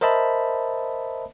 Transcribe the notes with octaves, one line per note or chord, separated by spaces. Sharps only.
A#4 C5 D#5 E5 A5 B5